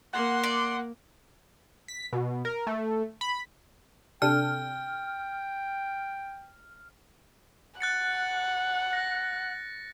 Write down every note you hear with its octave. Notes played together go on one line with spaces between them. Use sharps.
A#3 F#5 C6
D5
B6
B2
A#4
A3
B5
C3 D4 A4 G5 F6
F#5 F#6 A6 C#7
A#6